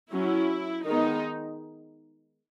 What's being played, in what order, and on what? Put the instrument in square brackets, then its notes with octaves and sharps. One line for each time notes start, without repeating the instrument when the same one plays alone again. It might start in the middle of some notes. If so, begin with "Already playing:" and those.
[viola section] F#3 C#4 E4
D#3 G#3 B3 D#4